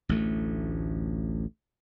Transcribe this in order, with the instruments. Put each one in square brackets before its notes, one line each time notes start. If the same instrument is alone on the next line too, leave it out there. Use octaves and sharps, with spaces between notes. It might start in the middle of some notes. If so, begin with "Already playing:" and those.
[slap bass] A1 D2 A3